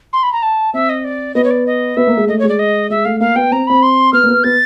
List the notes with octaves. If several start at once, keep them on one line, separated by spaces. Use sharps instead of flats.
C6
B5
A#5
A5
C4 E5
D#5
D5
B3 D#5
C#5
D5
D#5
B3 E5
A#3
G#3
A3 D#5
C#5
G#3
D5
D#5
G#3 E5
A3 F5
A#3 F5
B3 G5
C4 A#5
C4 B5
C6
B3 F6
A#3
B3
B3 A6